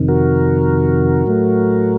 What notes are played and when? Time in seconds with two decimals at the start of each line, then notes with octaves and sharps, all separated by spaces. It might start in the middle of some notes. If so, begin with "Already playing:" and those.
Already playing: F2 C3 D#3
0.08 F#4 A#4
1.26 A2 F#3 A3